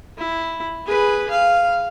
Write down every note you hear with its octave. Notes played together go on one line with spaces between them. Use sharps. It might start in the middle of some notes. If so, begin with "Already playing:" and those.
E4
G#4 B4
F5